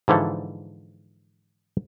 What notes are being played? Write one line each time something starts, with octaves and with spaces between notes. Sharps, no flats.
G#2 D3 E3 F3 A4